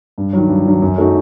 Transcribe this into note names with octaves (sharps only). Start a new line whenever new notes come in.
G2
D#3 F#3
G2
D#3 F#3
F#2
F#3 A3 D#4 F#4